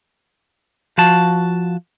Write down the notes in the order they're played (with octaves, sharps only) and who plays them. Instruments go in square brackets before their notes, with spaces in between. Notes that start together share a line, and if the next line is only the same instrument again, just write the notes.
[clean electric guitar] F3 F#4 A5